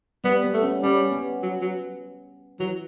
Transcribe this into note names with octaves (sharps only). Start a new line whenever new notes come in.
G3 B3
B3
A3
C#4
G3 C#4
B3
F#3
F#3
E3 F#3